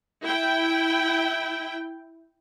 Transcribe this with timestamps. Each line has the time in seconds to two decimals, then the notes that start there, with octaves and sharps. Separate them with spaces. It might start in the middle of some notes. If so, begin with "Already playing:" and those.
0.22 E4 G5